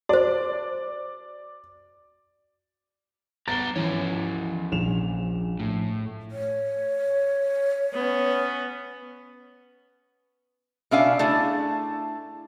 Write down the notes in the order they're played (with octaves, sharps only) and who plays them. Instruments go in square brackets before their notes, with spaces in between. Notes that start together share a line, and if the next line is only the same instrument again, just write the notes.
[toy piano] F#4 C5 [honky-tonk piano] D5
[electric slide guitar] B3 B4 A#5 [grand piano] A6 G7
[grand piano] E3 [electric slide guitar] F3 C#4 C#5
[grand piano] A#1 E7 F7
[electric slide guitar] A2
[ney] C#5
[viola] B3 C#4
[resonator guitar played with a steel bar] B2 C#4 D4 E5 F5 G#5
A3 D4 E4 G#4